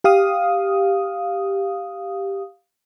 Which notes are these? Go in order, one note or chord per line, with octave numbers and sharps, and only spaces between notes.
G4 F5 D#6